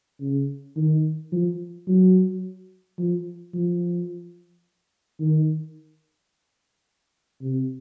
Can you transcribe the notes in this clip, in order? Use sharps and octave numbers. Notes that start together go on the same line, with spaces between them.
C#3
D#3
F3
F#3
F3
F3
D#3
C3